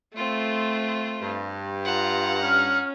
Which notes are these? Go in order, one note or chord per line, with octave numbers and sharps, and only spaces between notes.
A3 C4 F4
G2
F4 F#5 A#5
C#4 F6